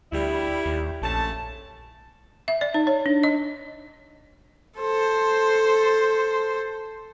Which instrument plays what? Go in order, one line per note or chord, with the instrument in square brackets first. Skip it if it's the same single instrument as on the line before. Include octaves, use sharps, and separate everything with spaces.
[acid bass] D2 [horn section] G3 E4
[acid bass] D#2
[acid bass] A#1 [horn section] A3 C#4 A5
[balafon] E5
D5
D#4
C#5
D4
D#5
[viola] A4 C5